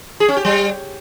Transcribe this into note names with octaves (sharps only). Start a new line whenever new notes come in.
G#4
C#4
G4
G3